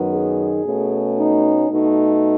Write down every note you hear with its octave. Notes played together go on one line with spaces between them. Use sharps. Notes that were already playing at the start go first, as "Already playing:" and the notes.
Already playing: F#2 D#3 F#3 B3 D#4
G#4
B2 A3 C#4
D#4
B2 A3 D#4